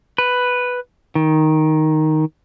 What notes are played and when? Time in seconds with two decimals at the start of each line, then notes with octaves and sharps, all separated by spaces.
0.18 B4
1.15 D#3